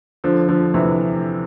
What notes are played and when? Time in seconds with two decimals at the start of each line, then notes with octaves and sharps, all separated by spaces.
0.24 D3 F3
0.48 D3 F3
0.74 C3 E3